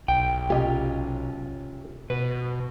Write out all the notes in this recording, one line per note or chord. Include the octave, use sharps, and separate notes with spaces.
B1 G5
C3 C#4 F4 G4 D#5
B2 B4